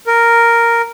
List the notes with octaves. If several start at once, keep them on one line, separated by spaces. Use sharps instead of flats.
A#4